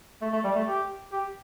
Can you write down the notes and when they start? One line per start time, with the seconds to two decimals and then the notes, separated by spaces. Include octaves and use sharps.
0.22 A3
0.33 A3
0.44 G3
0.56 A3
0.67 G4
1.12 G4